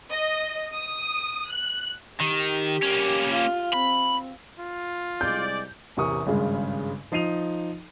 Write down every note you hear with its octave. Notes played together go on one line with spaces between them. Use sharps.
D#5
D#6
F#6
D#3 G4
A#3 C#4
F4
C4 B5
F4
C2 G#3 D5 G6
A1 E2 C3 A#4 C#6 D#6
G#1 G2 C#3 G#3
F3 D#4 C7 D#7 F7